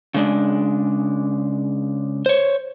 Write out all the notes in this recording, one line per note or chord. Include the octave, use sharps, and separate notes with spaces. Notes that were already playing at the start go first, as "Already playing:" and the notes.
C#3 G#3 D4
C5 C#5